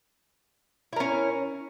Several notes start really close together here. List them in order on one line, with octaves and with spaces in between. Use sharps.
E4 A#4 C#4